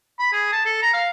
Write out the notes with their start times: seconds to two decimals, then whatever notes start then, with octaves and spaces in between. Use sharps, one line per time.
0.19 B5
0.32 G#4
0.52 A5
0.65 A4
0.82 A#5
0.94 F5